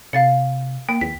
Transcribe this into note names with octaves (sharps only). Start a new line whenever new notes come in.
C3 F5 A6 C#7
A#3 G5
D#2 B6